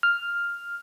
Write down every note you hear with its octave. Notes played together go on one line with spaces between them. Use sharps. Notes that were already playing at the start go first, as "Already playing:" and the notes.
F6